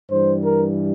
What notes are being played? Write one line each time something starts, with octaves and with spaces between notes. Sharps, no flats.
G2 E3 G3 C5
A#4